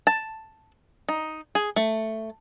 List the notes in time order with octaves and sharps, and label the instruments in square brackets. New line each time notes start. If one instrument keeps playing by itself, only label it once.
[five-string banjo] A5
D#4
G#4
A3